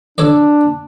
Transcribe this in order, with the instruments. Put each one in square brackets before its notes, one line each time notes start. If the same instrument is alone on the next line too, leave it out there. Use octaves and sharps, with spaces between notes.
[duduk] D4 [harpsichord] A4 C#5 D5